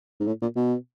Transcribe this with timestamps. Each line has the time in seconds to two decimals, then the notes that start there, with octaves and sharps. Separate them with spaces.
0.20 G#2
0.27 A2
0.42 A#2
0.56 B2